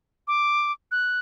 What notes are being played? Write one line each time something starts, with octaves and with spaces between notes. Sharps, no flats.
D6
F#6